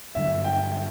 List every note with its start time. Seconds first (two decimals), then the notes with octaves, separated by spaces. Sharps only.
0.15 G2 D3 F#3 E5
0.44 G5